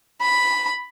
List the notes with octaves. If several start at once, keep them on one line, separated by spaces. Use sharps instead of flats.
B5